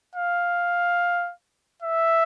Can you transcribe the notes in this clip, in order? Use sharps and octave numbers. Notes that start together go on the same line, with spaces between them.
F5
E5